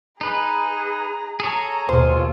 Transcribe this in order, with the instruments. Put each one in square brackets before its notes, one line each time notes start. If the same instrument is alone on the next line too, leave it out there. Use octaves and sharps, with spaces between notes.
[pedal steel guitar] D#4 B4 [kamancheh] G#4 A#5
[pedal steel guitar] G#4 A4 C#5 [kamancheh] A#5
[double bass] D#2 B2 [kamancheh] F4 [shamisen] C5